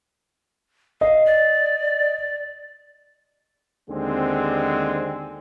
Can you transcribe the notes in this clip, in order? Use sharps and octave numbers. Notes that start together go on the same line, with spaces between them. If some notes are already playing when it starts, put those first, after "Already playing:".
D#5 F5
D5
D#2 D3 G#3 C4